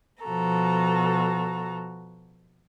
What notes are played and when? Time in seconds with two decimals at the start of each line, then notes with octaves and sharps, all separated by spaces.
0.25 B2 F3 F#4 A4 A#5